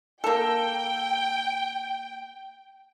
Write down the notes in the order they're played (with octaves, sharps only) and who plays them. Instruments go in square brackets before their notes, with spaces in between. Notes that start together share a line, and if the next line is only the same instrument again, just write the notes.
[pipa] A#3 A4 [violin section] G5